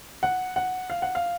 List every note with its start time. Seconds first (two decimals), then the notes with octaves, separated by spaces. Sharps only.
0.23 F#5
0.56 F#5
0.90 F5
1.02 F#5
1.15 F5